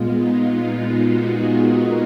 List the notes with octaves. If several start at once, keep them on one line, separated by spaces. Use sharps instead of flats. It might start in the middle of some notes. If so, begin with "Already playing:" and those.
Already playing: A#2 G#3 B3 F4
D#4
F4
D#4 F#4
F4 G#4
F#4 A#4